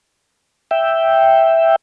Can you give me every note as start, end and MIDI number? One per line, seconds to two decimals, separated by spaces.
0.71 1.76 76
0.71 1.76 79